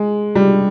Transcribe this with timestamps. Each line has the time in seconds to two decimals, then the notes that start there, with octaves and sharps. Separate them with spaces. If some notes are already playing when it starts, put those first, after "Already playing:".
Already playing: G#3
0.35 G3